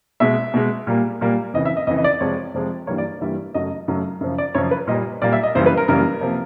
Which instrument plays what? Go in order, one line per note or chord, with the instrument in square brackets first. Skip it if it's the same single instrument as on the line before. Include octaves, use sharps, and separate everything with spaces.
[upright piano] B2 G#3 E5
B2 G#3
A#2 G3 A#3
A#2 G3 A#3
F2 C#3 E3 D#5
E5
D#5
F2 C#3 E3 D#5
D#5
D5
F2 C3 F3 G#3 C#5
F2 C3 F3 G#3
G2 E3 G3 A#3 C#5
D5
G2 E3 G3 A#3 E5
F#2 C#3 F#3 A3 D#5
F#2 C#3 F#3 A3
F#2 C#3 F3
D5
F#2 C#3 F3 C#5
B4
A#2 G3 A#3 D#5
A#2 G3 A#3 D5
E5
D#5
F#2 C#3 E3 G3 A#3 C5
B4
A#4
F#2 C#3 E3 G3 A#3 A#4
C3 F3 A#3